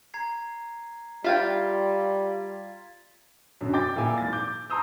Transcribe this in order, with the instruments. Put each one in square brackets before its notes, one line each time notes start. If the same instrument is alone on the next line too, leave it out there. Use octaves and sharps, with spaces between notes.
[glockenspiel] A#5 G#6 C7
[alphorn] G3 [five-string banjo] E4 F5 G5 [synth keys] F4 [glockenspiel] G#6 A6 B6
[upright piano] F#2 B2 D3
D#5 G5 D6 G6 A6
A#2 A#3 E4 G#5 D6
G#1 A6
D6 G6
A5 A#5 C6 D#6 E6 G6